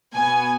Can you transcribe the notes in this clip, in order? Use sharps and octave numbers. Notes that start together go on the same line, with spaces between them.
B2 B3 G#5